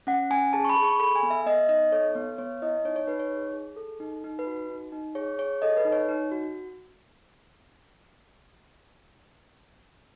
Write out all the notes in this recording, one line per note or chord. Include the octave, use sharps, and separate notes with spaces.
C#4 F#5
C#4 G#5
G#4 A5
C#6
B5
G#4
C#6
A4 B5
G#5
B3
E5
B3 D#5
D#4 D#5
A4 C#5
B3
B3 C#5
E4 D#5
D#4 C#5
C#5
D#4 B4
C#5
G#4
G#4
A4
D#4
D#4
B4
F#4
D#4
D#4
G#4 C#5
G#4 C#5
A4 D#5
B4
D#4
C#5
D#4
F#4